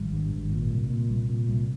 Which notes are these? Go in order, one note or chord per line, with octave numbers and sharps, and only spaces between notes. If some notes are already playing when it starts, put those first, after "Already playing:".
Already playing: G#1 G3
G2
G#1
A#2
C2
A#2
C2
A#2
C2